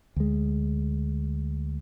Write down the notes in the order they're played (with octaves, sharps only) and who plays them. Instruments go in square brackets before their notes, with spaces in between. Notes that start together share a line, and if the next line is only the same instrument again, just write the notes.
[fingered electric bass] D2 G#3